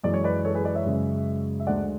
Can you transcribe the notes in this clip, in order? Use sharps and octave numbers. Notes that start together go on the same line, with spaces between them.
F#2 E3 G#3 D5
C#5
B4 D5
A4 C#5
G#4 B4
B4 D5
C#5 E5
F#2 C#3 G#3
E5
D2 D3 G#3 D5 F#5